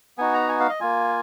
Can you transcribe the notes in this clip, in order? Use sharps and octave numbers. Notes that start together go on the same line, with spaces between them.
B3 D#4 F#4 G#5
A#5
G#5
F5
D#5
A#3 F4 G#5